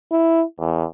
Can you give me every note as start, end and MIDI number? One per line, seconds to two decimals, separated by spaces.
0.12 0.44 64
0.59 0.86 40